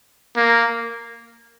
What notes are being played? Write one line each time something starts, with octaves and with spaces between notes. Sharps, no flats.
A#3